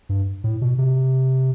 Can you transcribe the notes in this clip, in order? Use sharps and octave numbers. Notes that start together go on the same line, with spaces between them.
G2
A2
B2
C3